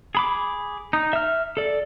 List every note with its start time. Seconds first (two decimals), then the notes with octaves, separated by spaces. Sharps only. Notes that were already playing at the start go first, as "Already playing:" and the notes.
0.15 G#4 B5 D6
0.93 D#4
1.13 E5 F6
1.57 A4 D5